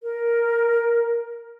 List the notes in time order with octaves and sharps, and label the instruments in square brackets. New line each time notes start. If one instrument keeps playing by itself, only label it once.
[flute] A#4